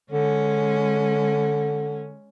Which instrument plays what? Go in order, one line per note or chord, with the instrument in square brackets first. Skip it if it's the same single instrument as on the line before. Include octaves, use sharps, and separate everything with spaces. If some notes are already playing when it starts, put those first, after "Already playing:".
[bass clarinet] D3 [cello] G#3 C#4